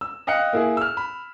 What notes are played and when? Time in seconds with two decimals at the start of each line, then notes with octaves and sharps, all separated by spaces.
0.01 E6
0.27 D#5 F5 G5 F#6 C#7
0.53 A#3 E4 G#4
0.77 E6 F6
0.97 B5